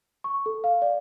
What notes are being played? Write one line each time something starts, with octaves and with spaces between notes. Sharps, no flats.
C#6
A4
F5
D5